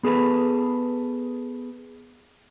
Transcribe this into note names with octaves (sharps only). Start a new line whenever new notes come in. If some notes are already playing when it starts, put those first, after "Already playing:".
B3 G#4 A4 B4